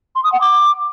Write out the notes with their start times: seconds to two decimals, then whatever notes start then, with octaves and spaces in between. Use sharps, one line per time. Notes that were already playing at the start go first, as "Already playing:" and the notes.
0.15 C6
0.24 D#6
0.32 F#5
0.41 D6